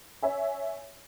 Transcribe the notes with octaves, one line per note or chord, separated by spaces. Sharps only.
C#5 E5 G#5